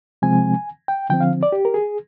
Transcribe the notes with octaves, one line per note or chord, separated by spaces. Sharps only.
C3 F3 G#3 C4 G#5
G5
D3 F3 C4 G5
F5
D5
G4
A#4
G#4